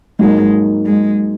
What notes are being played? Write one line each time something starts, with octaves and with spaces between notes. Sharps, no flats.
G#2 F#3 G#3 A#3
G#3